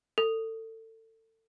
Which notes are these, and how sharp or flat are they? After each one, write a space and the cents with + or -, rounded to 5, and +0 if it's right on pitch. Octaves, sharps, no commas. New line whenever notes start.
A4 +30